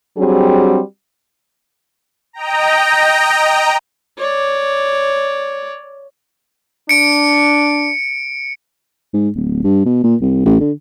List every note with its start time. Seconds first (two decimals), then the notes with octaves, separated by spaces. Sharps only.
0.18 F#3 G3 C4 D4 F#4 G#4
2.33 D#5 G5 A#5
4.18 C#5 D5
6.89 D4 C#7 D7
9.14 G#2
9.36 D1
9.64 G2
9.86 B2
10.04 A#2
10.22 C2
10.46 A1
10.60 D3